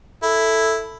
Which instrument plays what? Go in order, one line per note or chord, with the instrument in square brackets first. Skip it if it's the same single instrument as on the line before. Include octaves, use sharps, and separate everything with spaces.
[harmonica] E4 [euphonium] A4